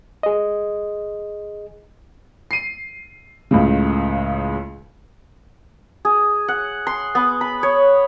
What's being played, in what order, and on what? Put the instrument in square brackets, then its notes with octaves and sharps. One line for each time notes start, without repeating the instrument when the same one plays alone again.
[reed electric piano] G#4 D#5
[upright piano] C7 D#7
C#2 A2 C#3
[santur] G#4
F#5
C6
B3
B5
C#5